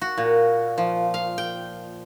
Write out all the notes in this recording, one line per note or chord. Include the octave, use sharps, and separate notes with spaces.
F#4
A#2
F3
F5
G5